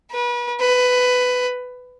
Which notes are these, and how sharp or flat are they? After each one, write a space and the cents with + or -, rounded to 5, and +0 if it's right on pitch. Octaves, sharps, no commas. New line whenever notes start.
B4 -35
B4 +15